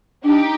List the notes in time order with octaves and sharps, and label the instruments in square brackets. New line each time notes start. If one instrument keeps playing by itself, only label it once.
[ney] D4 [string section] D#4 G4